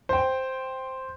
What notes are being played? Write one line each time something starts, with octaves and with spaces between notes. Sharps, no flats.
C5 G5